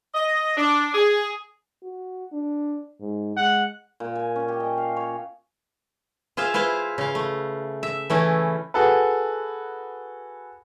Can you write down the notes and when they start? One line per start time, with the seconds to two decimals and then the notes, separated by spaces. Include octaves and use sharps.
0.14 D#5
0.57 D4
0.94 G#4
1.83 F#4
2.32 D4
3.01 G#2
3.37 G#3 F#5
4.00 A#2
4.15 G#5
4.36 C#4
4.48 G4
4.60 D#5
4.78 F5
4.97 C#5
6.37 F4 G#4 C5 E5 F5
6.54 E4 F4 B4 C5 F5
6.98 C#3 F5
7.15 A3
7.83 E5
8.10 E3 A3 C#4 E4
8.74 F#4 G#4 A4 B4